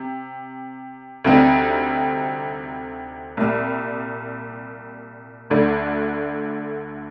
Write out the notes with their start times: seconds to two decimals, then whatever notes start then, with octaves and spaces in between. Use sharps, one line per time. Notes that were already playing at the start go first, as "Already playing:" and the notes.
Already playing: C3
1.24 D2 C3 G3 C4 D#4
3.37 C2 A#2 G3
5.50 D2 D3 A3 D4